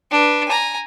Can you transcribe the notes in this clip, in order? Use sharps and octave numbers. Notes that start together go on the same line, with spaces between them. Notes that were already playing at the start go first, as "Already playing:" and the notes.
D4 B4
G#5 A#5